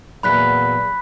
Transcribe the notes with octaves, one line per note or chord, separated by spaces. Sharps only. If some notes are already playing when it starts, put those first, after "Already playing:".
E2 A#2 F#3 B5 F#6 B6